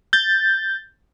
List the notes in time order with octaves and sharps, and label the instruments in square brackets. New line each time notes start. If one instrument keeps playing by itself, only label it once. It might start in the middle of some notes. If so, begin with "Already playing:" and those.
[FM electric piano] G6 A6